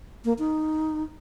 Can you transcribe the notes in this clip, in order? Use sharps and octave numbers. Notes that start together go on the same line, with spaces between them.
A#3
D#4